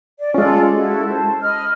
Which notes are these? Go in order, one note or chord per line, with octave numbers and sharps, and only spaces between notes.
D5
G#3 C#4 F4 A4 D5
E4 F#4 A4
C5 A5
D#5 B5 F6